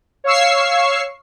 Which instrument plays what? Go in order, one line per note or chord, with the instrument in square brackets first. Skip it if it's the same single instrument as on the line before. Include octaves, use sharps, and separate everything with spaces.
[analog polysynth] C#5 F5 C#6 E6 C7